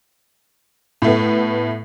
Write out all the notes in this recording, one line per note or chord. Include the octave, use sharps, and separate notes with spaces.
A2 A3 B3